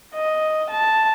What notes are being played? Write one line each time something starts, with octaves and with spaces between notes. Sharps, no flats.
D#5
A5